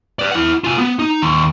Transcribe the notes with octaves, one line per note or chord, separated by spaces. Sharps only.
B4 D5
E4 F#5
F4 G#5
B3
D#4
D#2 C6